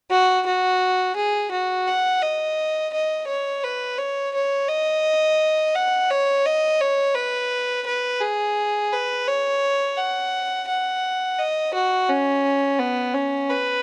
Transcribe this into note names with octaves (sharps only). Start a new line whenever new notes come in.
F#4
F#4
G#4
F#4
F#5
D#5
D#5
C#5
B4
C#5
C#5
D#5
F#5
C#5
D#5
C#5
B4
B4
G#4
B4
C#5
F#5
F#5
D#5
F#4
C#4
B3
C#4
B4